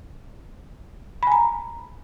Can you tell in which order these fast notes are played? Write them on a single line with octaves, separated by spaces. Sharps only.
B5 G#5 A#5